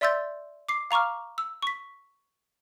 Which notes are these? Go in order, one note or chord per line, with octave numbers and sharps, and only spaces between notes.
D5 E5 C6 E6 G6 A6
D6 C7
F5 A#5 C#6 D6 F6
E6
C#6 B6